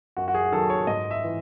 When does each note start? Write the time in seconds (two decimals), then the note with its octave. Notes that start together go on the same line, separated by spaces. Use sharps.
0.17 F#2 F#4
0.28 F#4
0.34 G#4
0.52 D#3 F#3 A4
0.70 C#5
0.87 G#2 D#5
1.11 E5
1.23 E3